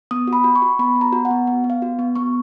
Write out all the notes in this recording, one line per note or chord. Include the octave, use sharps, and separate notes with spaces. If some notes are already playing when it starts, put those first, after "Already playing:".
B3 D#6
F#4
B5
F#4
C#6
F#4
B3 B5
B3
A#5
F#4
F#5
B3
B3
B3
F5
F#4
B3
B3 C#6